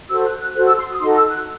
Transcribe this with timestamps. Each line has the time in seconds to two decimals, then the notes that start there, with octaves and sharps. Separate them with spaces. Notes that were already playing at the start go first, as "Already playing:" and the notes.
0.09 F#4 A4 C5 E6
0.24 F#6
0.40 F#6
0.55 F#4 A4 C5 F#6
0.66 E6
0.78 C6
0.89 D#6
1.00 D#4 F#4 A4 C6
1.15 E6
1.31 F#6